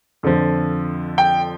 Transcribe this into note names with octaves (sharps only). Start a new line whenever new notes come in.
F2 D3 F3
G5